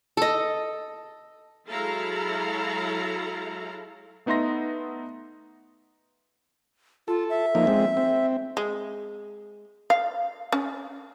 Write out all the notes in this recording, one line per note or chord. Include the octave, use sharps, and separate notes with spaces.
A4 D#5
F#3 G#3 E4 A4 F5 A#5
A3 B3 D#4 E5 C6 A#6
F4 A4
E5
F3 A#3 D#4
G#3 C4
C4
G#3
F5
C#4